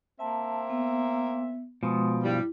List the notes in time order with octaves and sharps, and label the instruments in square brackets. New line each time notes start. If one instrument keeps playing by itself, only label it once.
[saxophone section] A#3 C4 E5 [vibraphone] A5
[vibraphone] B3
[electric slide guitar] B2 F3 [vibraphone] G#3 C6 D#6
[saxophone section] G2 G3 [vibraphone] E4